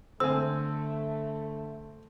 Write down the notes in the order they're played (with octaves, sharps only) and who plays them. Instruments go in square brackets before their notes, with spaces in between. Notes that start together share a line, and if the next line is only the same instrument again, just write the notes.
[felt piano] D3 [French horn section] A3 [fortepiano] C4 G#5 [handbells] E6